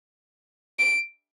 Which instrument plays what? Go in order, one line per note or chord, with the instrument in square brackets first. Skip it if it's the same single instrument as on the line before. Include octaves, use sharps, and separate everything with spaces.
[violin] D7